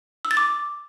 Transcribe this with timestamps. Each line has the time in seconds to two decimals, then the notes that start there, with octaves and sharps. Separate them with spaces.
0.25 E6
0.31 A6
0.37 D6